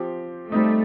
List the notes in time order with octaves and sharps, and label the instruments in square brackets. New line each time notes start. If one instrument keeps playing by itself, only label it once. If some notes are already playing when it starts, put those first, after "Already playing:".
Already playing: [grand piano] F3 C4 G4
[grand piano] G3 C4 D#4 [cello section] A3